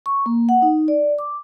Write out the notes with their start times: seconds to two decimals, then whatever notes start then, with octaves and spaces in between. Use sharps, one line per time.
0.06 C#6
0.26 A#3
0.49 F#5
0.62 D#4
0.88 D5
1.19 D6